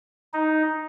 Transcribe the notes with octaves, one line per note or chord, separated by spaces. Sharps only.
D#4